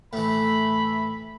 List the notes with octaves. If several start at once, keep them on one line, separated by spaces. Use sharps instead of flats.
A2 E3 A3 E5 B5